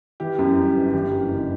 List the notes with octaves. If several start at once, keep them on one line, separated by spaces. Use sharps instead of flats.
E3 G4
F#2
G3
G1
E3 G4
F#2
F#1